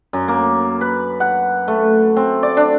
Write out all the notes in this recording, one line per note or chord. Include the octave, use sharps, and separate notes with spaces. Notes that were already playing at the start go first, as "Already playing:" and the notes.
F#2
A#3
B4
F#5
A3
C4
D5
D4